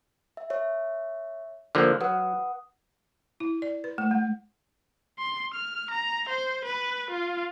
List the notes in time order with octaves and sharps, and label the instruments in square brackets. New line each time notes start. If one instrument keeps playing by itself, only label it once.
[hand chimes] E5
C#5 E5
[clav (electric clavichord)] D3 F3 A#3 [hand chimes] F6 F#6
[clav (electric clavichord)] F#3 [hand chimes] B4 F#5 D#6
[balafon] E4
D5
B4
A3
G#3
[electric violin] C6
F6
A#5
C5
B4
F4